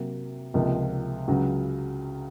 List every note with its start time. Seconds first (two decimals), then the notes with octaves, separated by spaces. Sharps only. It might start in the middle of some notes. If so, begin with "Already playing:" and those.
Already playing: C3 F#3 A#3
0.54 C#2 C3 F3 A#3 D#4
1.28 C#2 C#3 F#3